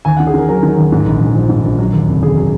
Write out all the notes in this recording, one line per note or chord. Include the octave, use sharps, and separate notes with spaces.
D#2 G#5
F#5
D#3
G#4
D#3 A#4
F#3 A#4
D#3
D#2
G#2
A#1
A#1
F3
G#2
A#1
F#3
D#2
F1
D#2 G#4
F#3